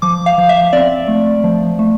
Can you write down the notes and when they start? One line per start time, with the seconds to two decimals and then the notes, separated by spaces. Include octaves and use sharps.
0.02 F3 D6
0.26 F5
0.38 F3
0.49 E5
0.73 C4 D5
1.08 A3
1.44 F3
1.79 A3